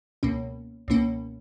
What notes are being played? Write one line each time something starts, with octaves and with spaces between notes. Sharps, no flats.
C#2 B2 A#3 C#4
C#2 B2 A#3 C#4